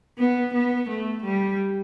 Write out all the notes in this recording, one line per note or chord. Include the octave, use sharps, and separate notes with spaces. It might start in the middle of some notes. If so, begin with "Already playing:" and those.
B3
B3
A3
G3